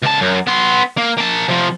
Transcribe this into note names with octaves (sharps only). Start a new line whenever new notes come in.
C#2 A5
F#2
B3 C6
A#3
A#3 A5
C3 F3